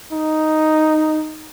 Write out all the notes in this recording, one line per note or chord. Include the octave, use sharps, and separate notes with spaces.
D#4